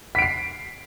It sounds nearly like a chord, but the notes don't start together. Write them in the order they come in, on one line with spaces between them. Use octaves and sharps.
B6 D7 C7